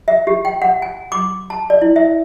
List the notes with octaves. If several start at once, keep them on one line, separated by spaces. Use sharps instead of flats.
E5
G4
G5
F#5
G#5
D6
A5
D5
E4
E5